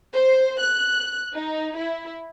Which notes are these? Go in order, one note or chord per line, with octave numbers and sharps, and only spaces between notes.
C5
F#6
D#4
E4